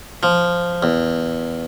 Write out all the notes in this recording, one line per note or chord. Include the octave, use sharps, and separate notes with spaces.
F3
E2